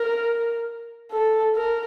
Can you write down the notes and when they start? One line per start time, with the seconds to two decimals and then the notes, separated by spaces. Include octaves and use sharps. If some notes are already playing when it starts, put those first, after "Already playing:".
Already playing: A#4
1.11 A4
1.56 A#4